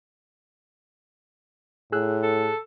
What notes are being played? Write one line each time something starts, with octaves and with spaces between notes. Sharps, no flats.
A2 G#4 E6 F#6
A4